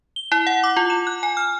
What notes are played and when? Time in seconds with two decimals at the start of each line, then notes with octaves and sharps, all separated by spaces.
0.16 G7
0.32 E4
0.47 F#5
0.64 D6
0.77 F4
0.90 E7
1.07 F#6
1.23 G#5
1.37 F6